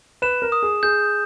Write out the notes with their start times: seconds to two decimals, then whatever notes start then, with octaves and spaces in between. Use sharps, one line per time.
0.22 B4 E7
0.42 A#4
0.52 D#6
0.63 G#4
0.83 G#4 G6